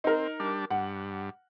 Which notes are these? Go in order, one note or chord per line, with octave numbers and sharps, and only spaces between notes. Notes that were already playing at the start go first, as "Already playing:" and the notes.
C4 D#4 A#4
G3 D4
G2 F#5